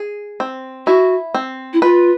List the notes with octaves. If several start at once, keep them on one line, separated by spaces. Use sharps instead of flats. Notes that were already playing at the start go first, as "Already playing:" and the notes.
Already playing: G#4
C4
E4 F#4
C4
E4
F4 B4